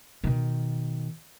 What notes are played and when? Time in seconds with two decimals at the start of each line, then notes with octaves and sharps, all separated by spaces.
0.24 B2 D#3